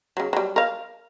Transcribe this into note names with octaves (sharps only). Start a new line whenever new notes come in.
C#3 F#3
F#3 G3
A#4 F5